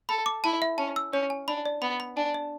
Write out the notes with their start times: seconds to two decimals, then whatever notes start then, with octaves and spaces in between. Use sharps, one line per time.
0.09 A4 B5
0.26 D6
0.44 E4 A5
0.62 E5
0.78 C#4 A5
0.96 E6
1.13 C#4 C#5
1.30 G#5
1.48 D4 B5
1.66 D5
1.82 B3 B5
2.00 B5
2.17 D4 G#5
2.34 D5